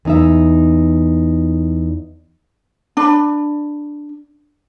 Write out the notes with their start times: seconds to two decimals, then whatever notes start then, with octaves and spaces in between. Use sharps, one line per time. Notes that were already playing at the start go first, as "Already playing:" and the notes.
0.05 E2 D#4 E5
2.97 D4 B5